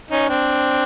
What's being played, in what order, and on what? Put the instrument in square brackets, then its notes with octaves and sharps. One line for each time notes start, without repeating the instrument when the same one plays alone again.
[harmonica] C#4 D#4
C4 D4